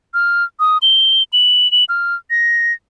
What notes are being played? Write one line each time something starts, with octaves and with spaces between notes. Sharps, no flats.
F6
D#6
G7
F#7
F#7
F6
A#6